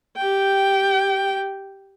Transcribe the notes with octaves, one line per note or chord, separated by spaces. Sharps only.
G4 G5